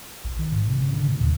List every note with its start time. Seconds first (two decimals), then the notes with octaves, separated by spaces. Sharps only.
0.24 B1
0.39 D#3
0.52 G#2
0.67 C3
0.81 C#3
0.94 D3
1.08 A#2
1.21 D#2